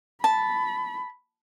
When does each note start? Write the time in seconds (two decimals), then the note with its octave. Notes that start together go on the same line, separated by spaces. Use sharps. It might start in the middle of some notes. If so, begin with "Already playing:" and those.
0.24 A5 B5